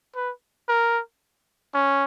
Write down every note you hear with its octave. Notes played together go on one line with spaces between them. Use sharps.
B4
A#4
C#4